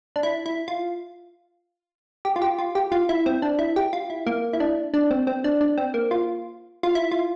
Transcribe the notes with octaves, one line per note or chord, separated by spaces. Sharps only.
D4
E4
E4
F4
G4
F4
G4
F4
G4
F4
E4
C4
D4
E4
G4
F4
E4
A#3
E4
D4
D4
C4
C4
D4
D4
C4
A#3
F4
F4
E4
F4